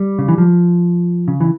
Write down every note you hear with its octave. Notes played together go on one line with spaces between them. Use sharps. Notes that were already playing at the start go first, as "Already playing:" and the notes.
Already playing: G3
C#3
E3
F3
C#3
E3